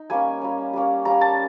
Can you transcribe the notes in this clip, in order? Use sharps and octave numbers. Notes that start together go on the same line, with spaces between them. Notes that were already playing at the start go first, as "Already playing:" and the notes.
Already playing: D#4
G3 A#3 C#4 G#5
G3 A#3 C#4
G3 A#3 C#4
G3 A#3 C#4 A#5
A5